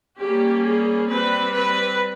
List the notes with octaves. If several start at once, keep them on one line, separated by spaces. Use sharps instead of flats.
G3 A#3 C#4 G4
G#4
G3 C4 B4
B4